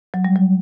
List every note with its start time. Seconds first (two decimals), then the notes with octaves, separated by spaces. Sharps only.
0.14 F#3
0.25 G3
0.36 F#3